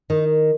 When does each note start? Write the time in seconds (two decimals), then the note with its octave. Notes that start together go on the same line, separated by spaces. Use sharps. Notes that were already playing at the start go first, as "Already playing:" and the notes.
0.10 D#3 D#4